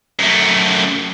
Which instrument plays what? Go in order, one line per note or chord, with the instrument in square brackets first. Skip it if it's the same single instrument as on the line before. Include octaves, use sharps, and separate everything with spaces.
[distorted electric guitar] F#2 A3